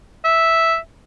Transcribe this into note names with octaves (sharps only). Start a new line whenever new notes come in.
E5